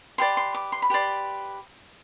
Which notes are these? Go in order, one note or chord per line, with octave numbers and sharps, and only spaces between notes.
G4 B4 D5 C6
C6
D6
C6
B5
G4 B4 D5 C6